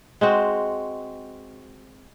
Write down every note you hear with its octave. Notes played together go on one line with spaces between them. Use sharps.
G#3 C4 F#4